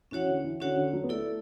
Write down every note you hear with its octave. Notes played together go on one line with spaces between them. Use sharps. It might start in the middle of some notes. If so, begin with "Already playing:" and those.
E3 C#4 F#4 C#5 F#5
D3
E3
D3 C#4 F#4 C#5 F#5
D3
F#3
B3
A3 E4 A4 D5